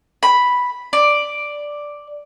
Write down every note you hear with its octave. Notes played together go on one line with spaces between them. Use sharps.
B5
D5